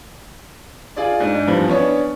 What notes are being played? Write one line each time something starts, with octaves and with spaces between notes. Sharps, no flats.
F4 G#4 D5
G#2 D4
E2 G2 F3
B3 C#4 D4 C#5